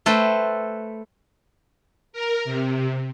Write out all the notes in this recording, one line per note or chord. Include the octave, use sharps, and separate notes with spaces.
A3 A4 B4 C5 G5
A#4
C3